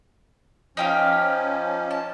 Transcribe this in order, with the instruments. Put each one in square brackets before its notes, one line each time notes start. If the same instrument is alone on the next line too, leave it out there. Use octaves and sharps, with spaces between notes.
[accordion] F3 C#4 [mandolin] D#4 G4 F5
[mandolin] A5